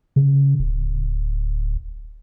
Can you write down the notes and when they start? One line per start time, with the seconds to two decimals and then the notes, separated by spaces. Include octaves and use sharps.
0.16 C#3
0.59 D1